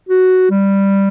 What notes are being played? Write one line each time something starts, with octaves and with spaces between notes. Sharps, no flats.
F#4
G3